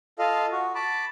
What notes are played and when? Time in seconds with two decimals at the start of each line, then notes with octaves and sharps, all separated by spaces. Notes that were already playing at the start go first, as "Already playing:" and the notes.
0.19 F4 A4 D#5 F5
0.52 F#4
0.75 A5 B5 D6